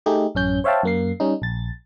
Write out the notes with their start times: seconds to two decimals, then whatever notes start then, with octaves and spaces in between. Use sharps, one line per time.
0.06 A3 D#4 G4 G#4
0.35 A1 F#2 C#4 G6
0.64 C5 C#5 E5 F5 G5 A5
0.83 F#2 A#3 C7
1.20 G3 C#4 D#4
1.42 A#1 A6